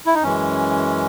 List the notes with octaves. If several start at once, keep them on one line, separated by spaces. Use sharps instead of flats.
E4
D#4
F#2 E3 G#3 C#4